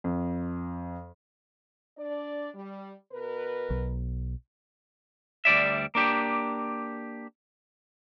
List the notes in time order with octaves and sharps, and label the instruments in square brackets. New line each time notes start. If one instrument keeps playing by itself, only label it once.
[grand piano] F2
[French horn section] D4 D5
G3
B2 A#4 B4
[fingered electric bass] B1
[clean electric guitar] D2 G3 D5 E5
A#3 D4 G4